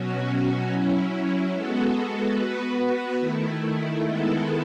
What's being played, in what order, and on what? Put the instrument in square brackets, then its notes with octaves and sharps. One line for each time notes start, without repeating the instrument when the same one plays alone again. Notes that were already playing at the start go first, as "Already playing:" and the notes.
Already playing: [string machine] B2 F#3 C#4 F#4
F#3 C#4 E4
G#3 B3 F#4 A4
B3 F#4 B4
D#3 A3 E4
D#3 G#3 B3 E4 A4